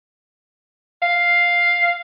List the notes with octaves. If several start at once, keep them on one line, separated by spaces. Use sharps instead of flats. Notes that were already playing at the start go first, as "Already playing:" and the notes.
F5